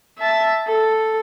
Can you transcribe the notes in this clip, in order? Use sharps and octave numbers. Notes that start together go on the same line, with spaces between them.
E5 A5
A4